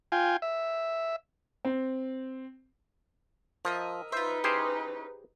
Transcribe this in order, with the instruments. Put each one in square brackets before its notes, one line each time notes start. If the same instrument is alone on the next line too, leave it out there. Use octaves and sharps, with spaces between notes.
[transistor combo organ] F4 G5 G#5
E5
[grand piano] C4
[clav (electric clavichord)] F3 [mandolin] A#4 D#5 E5
[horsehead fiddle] D#4 B4 [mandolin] F4 E5 [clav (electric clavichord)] C5
[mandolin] C#4 E4 C6 [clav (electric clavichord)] G4 G#4 C5